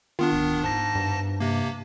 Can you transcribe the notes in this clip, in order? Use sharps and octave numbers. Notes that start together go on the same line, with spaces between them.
D#3 B3 D4 F4
D1
G#2 A5 A#6
G2
C3 A#3